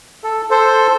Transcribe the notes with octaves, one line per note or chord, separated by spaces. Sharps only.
A4
A4 C5